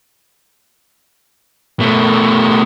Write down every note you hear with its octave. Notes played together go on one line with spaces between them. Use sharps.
B2 A3